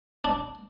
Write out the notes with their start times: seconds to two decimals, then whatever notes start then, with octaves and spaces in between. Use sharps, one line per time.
0.24 D4